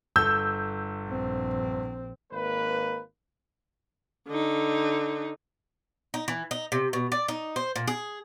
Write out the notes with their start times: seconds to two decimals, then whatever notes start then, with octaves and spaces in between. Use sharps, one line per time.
0.16 G1 A4 E6 G6
1.07 A#1 C4
2.31 G#1 A#3 B4
4.28 D3 D#4
6.14 D#4
6.28 E3
6.51 D#4
6.72 C3
6.93 B2
7.12 D5
7.28 D#4
7.56 C5
7.76 A#2
7.88 G#4